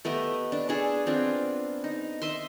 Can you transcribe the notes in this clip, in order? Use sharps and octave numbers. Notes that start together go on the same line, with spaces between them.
A3 B3 G4 D#5
D4
D4 G#4 A4
B3 C4 D4 F4
D#4
D#5 E5 C6